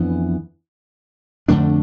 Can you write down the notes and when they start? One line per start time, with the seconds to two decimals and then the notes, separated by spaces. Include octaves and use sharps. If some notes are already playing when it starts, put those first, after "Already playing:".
Already playing: F2 E3 B3 D4
1.48 F2 D3 A3 D4